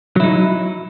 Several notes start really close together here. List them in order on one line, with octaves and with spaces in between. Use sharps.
F#3 E4 D#4